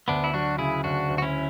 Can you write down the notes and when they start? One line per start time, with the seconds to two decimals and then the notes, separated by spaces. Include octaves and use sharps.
0.08 D2 B3 D4
0.24 E4
0.34 F#3 D4 F#4
0.58 C#3 E4 G#4
0.84 D2 D4 F#4
1.09 D2
1.18 F#4
1.22 C#4 E4